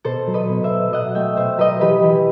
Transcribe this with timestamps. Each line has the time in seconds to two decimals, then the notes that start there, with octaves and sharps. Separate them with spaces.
0.05 B2 A4 C5
0.27 F#3
0.34 B4 D#5
0.49 B2
0.63 C5 E5
0.71 B2
0.91 F#3 D#5 F#5
1.15 A3 E5 G5
1.37 B2 C5 E5
1.57 F#3 B4 D#5
1.81 E3 G4 B4
2.03 E3